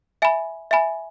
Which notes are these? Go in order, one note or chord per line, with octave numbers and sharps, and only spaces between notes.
E5 G#5 B5
E5 G#5 B5